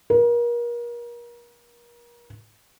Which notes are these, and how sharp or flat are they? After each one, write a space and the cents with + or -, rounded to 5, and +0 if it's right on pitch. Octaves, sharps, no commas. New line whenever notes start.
A#4 +35